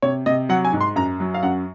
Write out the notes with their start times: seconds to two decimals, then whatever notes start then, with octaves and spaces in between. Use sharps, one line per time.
0.02 C3 C#5
0.26 C3 D#5
0.49 F#3 F#5
0.65 G#5
0.73 G#2
0.81 C6
0.96 F#2 A#5
1.20 F#3
1.34 F5
1.43 F#2 F#5